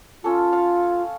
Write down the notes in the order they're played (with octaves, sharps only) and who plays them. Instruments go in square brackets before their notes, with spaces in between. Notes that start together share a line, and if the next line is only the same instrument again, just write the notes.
[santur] C#4 A4 [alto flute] F4
[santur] F5